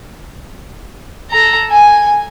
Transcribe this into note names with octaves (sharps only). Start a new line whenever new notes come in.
A4 A#5
G#5